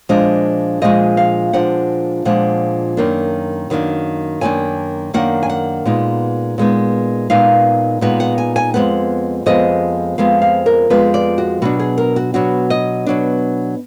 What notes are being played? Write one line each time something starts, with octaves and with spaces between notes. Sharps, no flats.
A#2 F3 G#3 D4 D#5
A#2 F3 G#3 D4 D#5
F5
A#2 F3 G#3 D4 F#5
A#2 F3 G#3 D4 F#5
F#2 D#3 A#3 D4
F#2 D#3 A#3 D4
F#2 D#3 A#3 D4 G#5
F#2 D#3 A#3 D4 F#5
G#5
F#5
A#2 G#3 B3 D#4
A#2 G#3 B3 D#4
A#2 G#3 B3 D#4 F5
A#2 G#3 B3 D#4 F#5
F#5
G#5
G#5
F2 F3 G#3 B3 F#5
F2 F3 G#3 B3 D#5
F2 F3 G#3 B3 F5
F5
A#4
F2 F3 G#3 B3 B4
D5
F#4
B2 F#3 D4 F#4
G#4
A#4
F#4
B2 F#3 D4 F#4
D#5
B2 F#3 D4